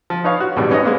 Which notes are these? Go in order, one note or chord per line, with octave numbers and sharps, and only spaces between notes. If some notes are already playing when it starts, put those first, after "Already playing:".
F3
D#4 B4 C#5 F5
F#4
A1 G#2 B2 G3
B3 C#4 D#4 D#5
G#3 A#3 B3